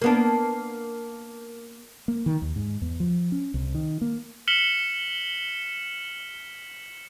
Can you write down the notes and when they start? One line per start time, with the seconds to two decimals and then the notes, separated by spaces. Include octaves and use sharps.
0.02 A#3 B3 D4
2.08 A#3
2.26 D#3
2.42 D#2
2.56 G#2
2.82 E2
3.00 F3
3.32 C#4
3.54 C2
3.75 D#3
4.01 A#3
4.48 F6 B6 C#7 E7 F#7 G7